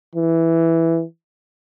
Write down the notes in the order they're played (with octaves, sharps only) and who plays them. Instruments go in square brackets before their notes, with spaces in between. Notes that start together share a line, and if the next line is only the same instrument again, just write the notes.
[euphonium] E3